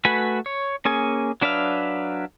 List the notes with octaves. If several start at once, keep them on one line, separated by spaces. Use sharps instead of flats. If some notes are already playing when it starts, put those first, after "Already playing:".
A3 F#4 B4 G#5 B5
C#5
A#3 C#4 G#4 G#5
F#3 D4 B4 E5 F5